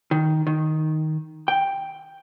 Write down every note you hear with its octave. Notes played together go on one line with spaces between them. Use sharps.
D#3
D#3
G5